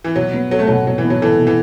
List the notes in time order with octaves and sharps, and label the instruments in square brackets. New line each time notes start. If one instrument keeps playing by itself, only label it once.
[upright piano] E3
[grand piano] B2 [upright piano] F#3
[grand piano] B3
[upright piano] F#3 [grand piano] A4
[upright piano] A3
[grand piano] B2 [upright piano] F#3
[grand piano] B2 [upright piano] F#3
[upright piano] E3
[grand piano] B3
[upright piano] F#3
[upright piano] E3 [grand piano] A4
[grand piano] B2
[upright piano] E3